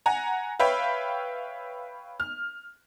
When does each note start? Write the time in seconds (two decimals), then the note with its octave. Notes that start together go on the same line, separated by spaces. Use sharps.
0.06 F#5 G#5 A#5
0.59 B4 C#5 E5 F5 G5 B5
2.20 F6